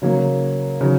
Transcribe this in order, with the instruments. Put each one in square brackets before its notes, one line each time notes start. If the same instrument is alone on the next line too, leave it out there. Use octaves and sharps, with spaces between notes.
[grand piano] C#3 F#3 A#3
C#3 F#3